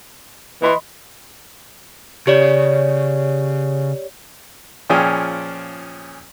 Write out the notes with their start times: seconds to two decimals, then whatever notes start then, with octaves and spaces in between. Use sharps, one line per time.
0.62 E3 D#5 B5 C6
2.27 C#3 G4 C#5 D5
4.90 A#2 F3 C#4 G#4 G5 G#5